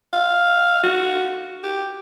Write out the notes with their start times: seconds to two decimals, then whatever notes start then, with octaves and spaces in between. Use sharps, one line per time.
0.13 F5
0.83 F#4
1.63 G4